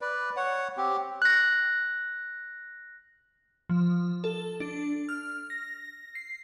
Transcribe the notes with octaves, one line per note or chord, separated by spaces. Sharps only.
B4 D5
C#5 F#5
C4 G4
F#6 A#6
F3
A4
D4
F6
A#6
C7